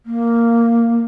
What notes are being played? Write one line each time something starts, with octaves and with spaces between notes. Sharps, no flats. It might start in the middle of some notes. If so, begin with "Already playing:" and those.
A#3